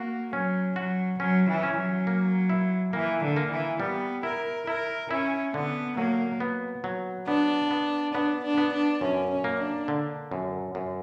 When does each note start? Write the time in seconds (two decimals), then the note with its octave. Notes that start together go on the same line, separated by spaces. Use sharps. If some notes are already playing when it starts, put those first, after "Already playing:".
Already playing: A#3 F#4
0.33 F#3 C#4
0.76 F#3 F#4
1.20 F#3 C#4
1.49 E3
1.63 C#4
1.78 F#3
2.07 A#3
2.50 E4
2.93 E3 A#3
3.22 D3
3.36 A#3
3.51 E3
3.80 G3 B3
4.23 E4 A#4
4.67 E4 A#4
5.11 C#4 E4
5.54 D3 B3
5.97 F#3 A#3
6.40 B3
6.84 F#3
7.28 B3 D4
7.71 B3
8.14 B3 D4
8.43 D4
8.58 B3
8.73 D4
9.01 F#2 C#4
9.30 C#4
9.44 A#3
9.59 D4
9.88 D3
10.31 F#2
10.75 F#2